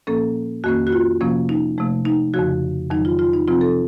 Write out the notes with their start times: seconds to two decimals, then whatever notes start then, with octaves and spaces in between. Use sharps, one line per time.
0.07 A#2 F3 A#3 C#4 A4
0.64 F2 D#3 A#3 C#4 F#4
0.87 F#4
0.92 F4
1.21 C3 F3 A#3 C#4
1.49 D#4
1.78 C3 F3 A3
2.05 D#4
2.34 F2 C#3 F3 F#4
2.90 F2 D#3 F#3 D#4
3.05 F4
3.19 F4
3.33 D#4
3.48 C3 F3 C4 F4
3.61 A4